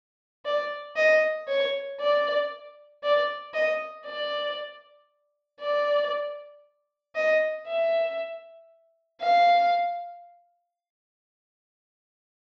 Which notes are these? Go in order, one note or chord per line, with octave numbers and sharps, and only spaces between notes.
D5
D#5
C#5
D5
D5
D#5
D5
D5
D#5
E5
F5